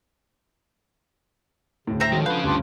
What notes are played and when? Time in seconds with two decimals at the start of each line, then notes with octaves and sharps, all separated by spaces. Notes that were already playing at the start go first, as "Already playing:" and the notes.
1.87 D2 A2 C#3
2.00 C4 E5 A#5
2.12 D3 D#3 F3 G#3 F#4 C#5
2.26 C#4 B4 F5 G6
2.44 D2 G2 D4 F4 G4